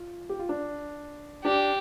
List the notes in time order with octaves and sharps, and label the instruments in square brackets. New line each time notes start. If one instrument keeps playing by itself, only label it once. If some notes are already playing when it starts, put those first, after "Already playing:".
Already playing: [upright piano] F4
G4
F4
D4
[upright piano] D4 [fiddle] G4